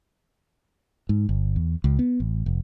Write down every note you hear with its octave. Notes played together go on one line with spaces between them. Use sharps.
G#2
G1
E2
C#2
B3
A1
F1